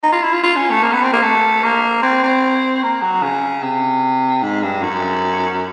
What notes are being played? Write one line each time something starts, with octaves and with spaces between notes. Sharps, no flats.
D#4
F4
E4
F4
F4
C#4
A3
A#3
B3
C4
A#3
A3
A#3
C4
C4
A#3
F#3
C#3
C3
G#2
G2
F#2